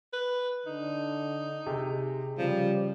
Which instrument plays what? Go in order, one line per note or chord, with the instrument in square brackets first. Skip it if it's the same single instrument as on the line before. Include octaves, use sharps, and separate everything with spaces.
[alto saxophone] B4
[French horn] D3 [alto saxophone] D#4
[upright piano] C3 [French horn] G#4
[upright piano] C#3 [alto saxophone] F3 [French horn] G3